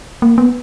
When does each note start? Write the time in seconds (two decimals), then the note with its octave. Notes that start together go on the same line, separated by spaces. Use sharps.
0.22 A#3
0.38 B3